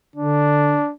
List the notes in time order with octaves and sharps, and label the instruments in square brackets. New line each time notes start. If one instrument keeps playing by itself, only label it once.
[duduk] D3 [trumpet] D4